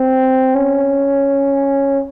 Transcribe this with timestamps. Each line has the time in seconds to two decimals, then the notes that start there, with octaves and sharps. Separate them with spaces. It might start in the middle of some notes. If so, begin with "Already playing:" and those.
Already playing: C4
0.55 C#4